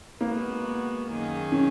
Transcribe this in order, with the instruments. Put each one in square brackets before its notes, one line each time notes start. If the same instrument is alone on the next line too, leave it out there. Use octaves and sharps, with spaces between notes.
[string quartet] G#3 B3 F#4 [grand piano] A#3
[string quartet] F#2 D#3 A#3 D#4 G#4
[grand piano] C#4